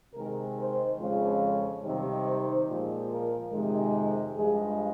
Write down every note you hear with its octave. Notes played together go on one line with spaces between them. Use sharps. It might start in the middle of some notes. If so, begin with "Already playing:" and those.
C3 D#3 G#3 A#4
C5
F2 C#3 F3 G#3
C#5
C3 D#3 G3
C5
A#2 F3 G#3
A#4
F2 C3 D#3 G#3
G2 F3 G#3 G#4